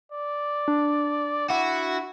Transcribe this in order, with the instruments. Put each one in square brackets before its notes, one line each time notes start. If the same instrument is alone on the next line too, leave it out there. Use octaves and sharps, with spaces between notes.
[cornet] D5
[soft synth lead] D4
[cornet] E4 [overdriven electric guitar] F#4